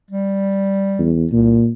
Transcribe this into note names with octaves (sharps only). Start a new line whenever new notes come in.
G3
E2
C2 A#2